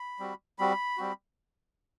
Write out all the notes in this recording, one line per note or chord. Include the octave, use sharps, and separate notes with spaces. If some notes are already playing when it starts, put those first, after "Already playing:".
Already playing: B5
G3 C4 F#4
G3 C4 F#4 B5
G3 C4 F#4